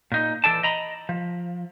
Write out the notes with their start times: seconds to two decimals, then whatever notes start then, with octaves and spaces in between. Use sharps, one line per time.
0.12 A#2 D#4
0.44 E3 A4 D5 A5
0.63 D#5 A#5 B5
1.09 F3